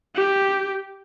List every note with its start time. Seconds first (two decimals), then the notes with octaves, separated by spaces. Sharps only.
0.15 G4